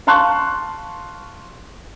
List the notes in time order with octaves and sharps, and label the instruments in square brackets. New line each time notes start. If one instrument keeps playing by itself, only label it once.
[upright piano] F5 A5 C6 C#6 F#6